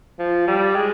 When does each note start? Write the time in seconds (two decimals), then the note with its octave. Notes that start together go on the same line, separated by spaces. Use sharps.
0.19 F3
0.48 G3
0.76 G#3